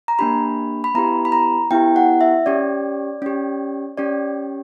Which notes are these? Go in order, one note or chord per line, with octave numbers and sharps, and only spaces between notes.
A#5
A#3 D4 G4 B5
B5
B3 E4 G4 A#5
B5
A#5
B3 E4 G4 G5
F#5
E5
C#4 G4 D5
C#4 G4
C#4 G4 D5